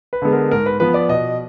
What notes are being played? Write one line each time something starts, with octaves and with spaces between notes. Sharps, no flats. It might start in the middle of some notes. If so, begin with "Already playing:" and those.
B4
D3 G#3 B3
A#4
G#2 A#4
B4
F3 B3 B4
D5
B2 D#5